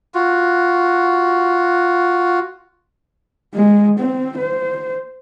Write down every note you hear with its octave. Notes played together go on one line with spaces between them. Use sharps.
F4 F#4
G#3
C4
C5